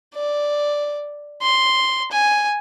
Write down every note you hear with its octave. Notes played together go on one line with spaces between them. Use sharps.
D5
C6
G#5